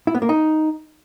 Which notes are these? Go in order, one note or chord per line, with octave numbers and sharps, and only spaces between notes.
E4
B3
A#3
D#4